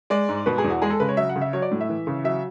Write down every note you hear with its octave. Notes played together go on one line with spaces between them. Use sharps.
G#3 D5
G#2
B2 B4
G#4
E2
F#4
G#3 G#4
A4
C#3 B4
C#5
F#3 E5
F#5
C#3
E5
F#3 C#5
D5
A2
E5
E3
C#3
F#3 E5